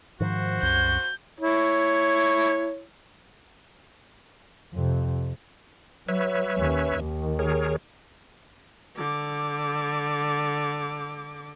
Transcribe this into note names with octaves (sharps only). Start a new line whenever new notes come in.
G#2 D#3 F3 F#4 C5
C2 F#2 G6
E4 C#5
F2 C3
F#3 B4 C#5 E5
D#2 C#4
D#2 D#3
G#4 A#4 C#5
D3 D6